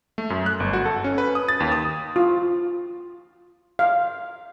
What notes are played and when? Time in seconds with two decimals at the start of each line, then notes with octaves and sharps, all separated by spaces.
0.18 A3
0.30 F#2
0.46 F#6
0.60 G1
0.73 F#4
0.86 A4
1.04 C#4
1.18 B4
1.35 D#6
1.49 A6
1.60 D#2
1.72 D#6
2.16 F4
3.79 F5